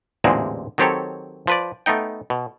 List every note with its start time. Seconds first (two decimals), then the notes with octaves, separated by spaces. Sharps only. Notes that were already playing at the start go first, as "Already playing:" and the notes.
0.24 A1 E2 A#2 D3 G#3 C4
0.78 D#3 F#3 C4 G4 A4 C#5
1.47 F3 B4 D5
1.86 A3 B3 D#4 G5
2.30 B2